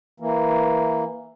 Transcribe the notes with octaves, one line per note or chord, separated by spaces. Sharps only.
E3 A#3